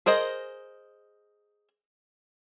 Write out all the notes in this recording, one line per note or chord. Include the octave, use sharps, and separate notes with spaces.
G#4 A#4 C5 D#5